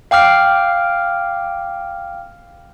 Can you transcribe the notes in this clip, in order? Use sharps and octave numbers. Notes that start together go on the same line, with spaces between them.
F5 G5 D6 F6 C7